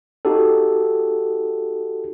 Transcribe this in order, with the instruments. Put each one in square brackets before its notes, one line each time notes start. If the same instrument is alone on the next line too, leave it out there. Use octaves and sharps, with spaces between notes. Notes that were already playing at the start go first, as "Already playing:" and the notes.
[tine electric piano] D#4 F#4 G4 A4